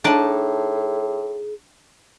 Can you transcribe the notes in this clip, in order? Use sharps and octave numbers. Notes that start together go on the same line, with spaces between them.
A2 D4 D#4 G#4 D5 A5